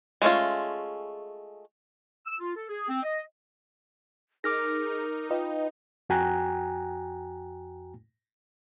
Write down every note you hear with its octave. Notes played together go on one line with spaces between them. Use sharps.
G#3 A3 B3 C#4 F4
E6
F4
A4
G#4
C4
D#5
D#4 G#4 A#4 D6 F6 A#6
F4 B4 D#5 G5
F2 F#4 G5 G#5 A#5 F#6